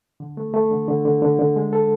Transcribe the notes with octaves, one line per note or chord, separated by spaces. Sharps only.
D3
A3
A3
D3
D3
D3
D3
D3
G#3
A4